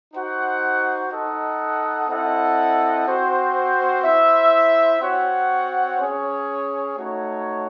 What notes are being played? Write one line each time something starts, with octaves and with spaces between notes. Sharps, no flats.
D#4 F#4 C5 F#5
D#4 A4 D#5 F#5
C4 E4 A4 D#5 F#5
C4 F#4 C5
E4 C5 E5
C4 F#4 C#5 F#5
C#4 G#4 C#5
A3 D#4 F#4 C#5